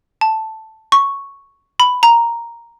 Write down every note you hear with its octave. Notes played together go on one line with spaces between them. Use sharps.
A5
C#6
B5
A#5